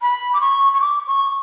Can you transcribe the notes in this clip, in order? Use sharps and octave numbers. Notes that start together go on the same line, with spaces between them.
B5
D6
C#6
C#6
D6
C#6